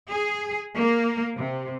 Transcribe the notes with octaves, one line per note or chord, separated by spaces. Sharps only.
G#4
A#3
C3